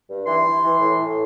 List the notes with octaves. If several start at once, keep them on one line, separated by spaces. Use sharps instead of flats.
G2
E3 C6
E3
E3
A2
A2